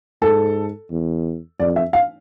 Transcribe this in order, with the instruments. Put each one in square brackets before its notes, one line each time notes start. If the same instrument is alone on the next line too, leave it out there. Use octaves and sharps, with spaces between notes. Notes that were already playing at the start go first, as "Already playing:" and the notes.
[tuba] G#2 [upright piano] A4
[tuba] E2
[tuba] F2 [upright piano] D5
[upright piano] E5
F5